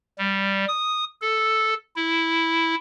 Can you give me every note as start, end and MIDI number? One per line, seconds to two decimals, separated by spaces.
0.18 0.65 55
0.68 1.04 87
1.21 1.74 69
1.96 2.75 64